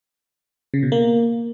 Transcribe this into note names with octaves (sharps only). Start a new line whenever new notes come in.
C#3
B2
A#3